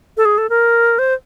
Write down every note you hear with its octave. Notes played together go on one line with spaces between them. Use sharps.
A4
G#4
A4
A#4
C5